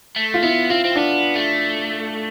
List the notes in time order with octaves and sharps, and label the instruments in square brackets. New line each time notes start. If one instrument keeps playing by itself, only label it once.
[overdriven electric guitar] A3
[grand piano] F4
[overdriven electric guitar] B3 [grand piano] E4
[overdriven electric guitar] C4 [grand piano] F4
[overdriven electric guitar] C4
[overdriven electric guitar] B3 [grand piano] D4
[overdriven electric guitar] A3